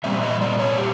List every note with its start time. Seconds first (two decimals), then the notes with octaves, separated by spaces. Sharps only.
0.04 A#2 G3 C4 E5
0.22 D#5
0.41 D5
0.59 C#5
0.78 G4